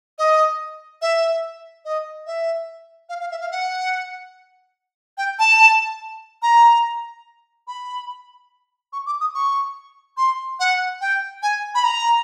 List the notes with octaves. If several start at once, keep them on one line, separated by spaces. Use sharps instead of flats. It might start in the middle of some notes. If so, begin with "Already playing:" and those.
D#5
E5
D#5
E5
F5
F5
E5
F5
F#5
G5
A5
A#5
B5
C#6
D6
D#6
C#6
C6
F#5
G5
G#5
B5
A#5